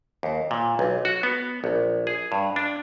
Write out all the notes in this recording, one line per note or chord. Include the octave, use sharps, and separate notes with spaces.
D#2
A#2
B1
F#4
B3
A#1
G#4
G2
D4